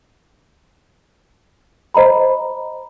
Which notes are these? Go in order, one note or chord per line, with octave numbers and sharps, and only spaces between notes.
C5 D#5 A#5 B5